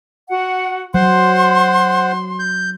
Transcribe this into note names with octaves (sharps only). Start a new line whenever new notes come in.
F#4 F#5
F#3 C5 F#5 C6
G6